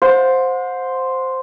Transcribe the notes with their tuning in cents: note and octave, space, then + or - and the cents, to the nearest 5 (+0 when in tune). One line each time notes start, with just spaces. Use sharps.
C5 +0 F#5 -40